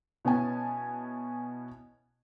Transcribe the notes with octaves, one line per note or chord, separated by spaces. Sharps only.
B2 B3 C#4 E4 G#5 A5